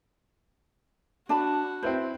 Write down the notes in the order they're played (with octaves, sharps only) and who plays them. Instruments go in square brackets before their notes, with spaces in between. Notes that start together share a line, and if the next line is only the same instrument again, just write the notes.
[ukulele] D4 A5 B5 [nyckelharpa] F#4
[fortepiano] C4 E4 B4 [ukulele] C5